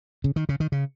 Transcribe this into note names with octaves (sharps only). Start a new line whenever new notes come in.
C#3
D#3
C#3
D#3
C#3